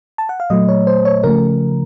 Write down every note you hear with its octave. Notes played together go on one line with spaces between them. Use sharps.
A5
F#5
F5
A#2 F#3 A3 D#5
C#5
C5
C#5
C#3 F3 A3 A#4